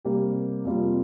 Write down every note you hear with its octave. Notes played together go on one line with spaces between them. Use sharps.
C3 G3 A#3 G4
F2 C3 G3 A#3 F4